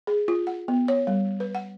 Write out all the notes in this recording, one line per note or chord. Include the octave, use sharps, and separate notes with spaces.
G#4
F4
F#5
B3
C#5
G3
B4
F#5